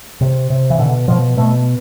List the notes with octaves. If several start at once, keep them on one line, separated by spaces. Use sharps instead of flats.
C3
C3
E3
B2 D3
B2 F3
B2 A3